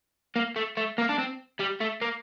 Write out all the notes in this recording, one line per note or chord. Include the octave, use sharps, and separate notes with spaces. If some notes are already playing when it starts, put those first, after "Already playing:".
A#3
A3
A3
A#3
D4
C4
G3
A3
A#3